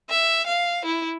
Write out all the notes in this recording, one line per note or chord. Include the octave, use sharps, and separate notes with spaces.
E5
F5
E4